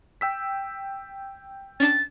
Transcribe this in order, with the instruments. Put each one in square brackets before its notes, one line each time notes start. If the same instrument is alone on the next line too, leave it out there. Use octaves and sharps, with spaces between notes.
[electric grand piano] G5 E6 B6
[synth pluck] C#4 D4 A5 [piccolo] A6